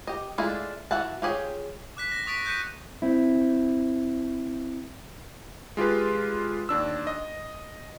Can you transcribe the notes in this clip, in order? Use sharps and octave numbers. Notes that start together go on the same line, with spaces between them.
G4 D#5
G#3 A3 D4 E4 F4
E3 F#4 E5 F#5 A5
F4 G4 G#4 C#5 G5
D6 F#6 B6
A#6
C#6 D#6 A6 B6 D7
F#6 G6 B6 C#7 D#7
C4 E4
G#3 F4 G4 B4
D#2 D4 E6
D#5